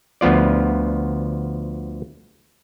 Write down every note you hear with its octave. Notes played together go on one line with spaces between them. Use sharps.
D2 F3 B3 F4 D5